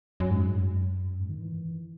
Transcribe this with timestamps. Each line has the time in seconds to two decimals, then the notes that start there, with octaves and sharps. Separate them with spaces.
0.20 F#2
0.31 G#2
0.41 F#2
1.20 G#2
1.30 D#3
1.41 E3